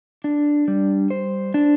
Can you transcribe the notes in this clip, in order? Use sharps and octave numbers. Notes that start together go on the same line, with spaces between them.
D4
G3
C5
D4